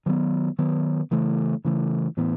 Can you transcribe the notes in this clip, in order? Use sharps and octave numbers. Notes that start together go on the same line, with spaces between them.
D#3 F#3 B3
D#3 F#3 B3
C#3 E3 A3
C#3 E3 A3
A2 E3 B3